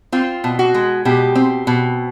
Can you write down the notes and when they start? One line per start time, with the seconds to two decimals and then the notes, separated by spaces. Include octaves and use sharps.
0.12 C4 F4
0.44 B2
0.59 F#4
0.74 G#3
1.05 B2 G4
1.35 C4
1.67 B2